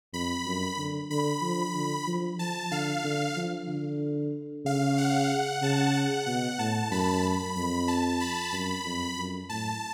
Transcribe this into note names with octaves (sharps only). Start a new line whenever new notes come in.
F2 B5
F#2
D3
D3 B5
F3
D3
F3
F3 A5
D3 F5
D3
F3
D3
C#3 F5
F#5
C#3 A5
F#5
B2 F#5
A2 A5
F#2 B5
F2 B5
A5
B5
F#2 B5
F2
F#2
A2 A5